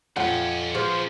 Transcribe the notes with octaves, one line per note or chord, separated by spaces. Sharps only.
F2 A#2 C#4 F4 C#5 F#5 G#5
F3 G#4 B4 C5